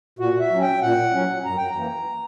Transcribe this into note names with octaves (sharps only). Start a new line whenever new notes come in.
A#2 F#4
E5
F#3 C#4
G5
A#2 F#5
F#3 C#4
F#2 A#5
G5
A#5
E3 A#3